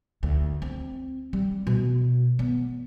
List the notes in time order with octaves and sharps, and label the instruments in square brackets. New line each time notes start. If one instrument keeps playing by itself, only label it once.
[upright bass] D2
C4
G3
B2
B3